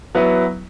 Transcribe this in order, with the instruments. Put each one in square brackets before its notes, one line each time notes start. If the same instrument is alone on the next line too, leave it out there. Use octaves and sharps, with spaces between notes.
[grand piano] F#3 B3 E4 B4